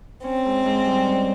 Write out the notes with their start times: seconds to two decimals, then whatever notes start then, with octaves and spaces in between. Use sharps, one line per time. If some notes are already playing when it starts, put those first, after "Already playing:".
0.24 C4 C#4
0.45 G#2
0.66 G#2
0.87 G3
1.06 C#4